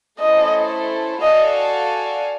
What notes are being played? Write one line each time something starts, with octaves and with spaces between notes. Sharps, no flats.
A3 C#4 E4 A4 C5 D#5
F#4 A4 D5 D#5 F5 G#5